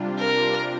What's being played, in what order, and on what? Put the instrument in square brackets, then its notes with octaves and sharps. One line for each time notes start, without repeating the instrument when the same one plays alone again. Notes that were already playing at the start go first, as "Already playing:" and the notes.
Already playing: [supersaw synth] C3 G3 D4 F4
[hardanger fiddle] A#4